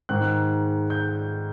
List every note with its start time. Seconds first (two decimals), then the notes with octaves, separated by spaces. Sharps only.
0.09 G#2 D#3 G#3 F#6
0.90 G6